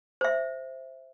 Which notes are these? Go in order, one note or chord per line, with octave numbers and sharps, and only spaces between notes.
C5 E5